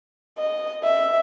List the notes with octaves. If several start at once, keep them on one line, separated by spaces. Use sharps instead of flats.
D#5
E5